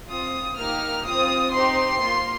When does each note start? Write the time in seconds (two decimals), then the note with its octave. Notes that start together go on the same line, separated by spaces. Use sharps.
0.08 C4 F4 D#6
0.56 A#3 D#4 G4 F6
1.05 C4 F4 D#6
1.53 C4 D#4 G4 C6
2.01 A#3 F4